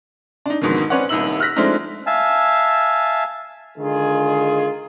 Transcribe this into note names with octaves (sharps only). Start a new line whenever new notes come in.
D4 D#4
F2 G#2 B2 D3 D#3
C4 C#4 B4 C#5 D5 F#5
D#1 C2 D#4 E6 F#7
F6 F#6 A#6 B6
F3 G#3 A3 C4 D4 D#4
E5 F5 G#5 A5
D3 D#3 G#3 F4 G#4